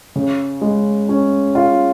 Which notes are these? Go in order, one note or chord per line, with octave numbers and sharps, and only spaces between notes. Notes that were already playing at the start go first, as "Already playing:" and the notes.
C#3
G#3
C#4
F4